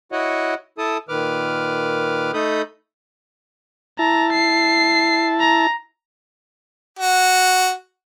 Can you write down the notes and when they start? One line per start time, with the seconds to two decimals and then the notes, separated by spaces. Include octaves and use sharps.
0.12 E4 F#4 C#5 D#5 F#5
0.78 E4 A4 A5 D#6
1.09 A#2 D#3 B4 D6 F6
2.34 A3 D#4 A4 B5 D#6 G6
3.99 E4 A5 A#5
4.32 C7
5.40 A#5
6.99 F#4